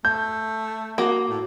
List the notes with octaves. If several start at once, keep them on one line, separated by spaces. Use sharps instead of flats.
A3 G6
A#3 F#4
A2